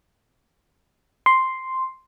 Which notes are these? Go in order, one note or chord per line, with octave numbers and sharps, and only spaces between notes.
C6